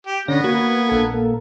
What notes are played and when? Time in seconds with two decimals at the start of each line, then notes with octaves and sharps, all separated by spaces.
0.07 G4
0.28 D3 B3 C#4 A#6
0.44 A#3 F#4 B4 G#6
0.89 A#1 A4
1.14 A#3